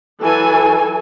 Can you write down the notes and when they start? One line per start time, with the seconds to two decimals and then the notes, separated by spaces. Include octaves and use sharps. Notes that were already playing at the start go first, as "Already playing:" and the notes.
0.22 E3 F#3 A4 G#5